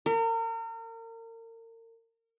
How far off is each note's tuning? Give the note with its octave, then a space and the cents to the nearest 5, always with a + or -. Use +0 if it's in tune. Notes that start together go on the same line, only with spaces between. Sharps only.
A#4 -35